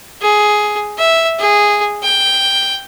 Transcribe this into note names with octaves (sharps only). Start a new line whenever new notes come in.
G#4
E5
G#4
G5